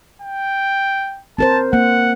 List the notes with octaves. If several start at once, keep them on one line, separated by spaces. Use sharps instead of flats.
G5
C4 A#4 C5 A5
A#3 F#5